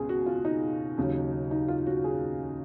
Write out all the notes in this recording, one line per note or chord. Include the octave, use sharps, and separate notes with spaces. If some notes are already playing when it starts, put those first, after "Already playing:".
Already playing: C#2 B2 G#4
F#4
F4
D#4
D#2 C#3 F#3
D#4
F4
F#4
G#4